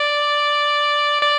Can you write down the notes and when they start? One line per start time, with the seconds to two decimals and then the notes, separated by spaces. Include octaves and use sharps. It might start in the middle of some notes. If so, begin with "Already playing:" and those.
Already playing: D5
1.22 D5